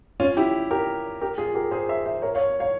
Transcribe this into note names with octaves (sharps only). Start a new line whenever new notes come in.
C#4 F4
E4 G4
G4 A#4
G4 A#4
F4 G#4
G4 A#4
G#4 C5
C5 E5
C5 E5
A#4 C#5
C#5 F5
C#5 F5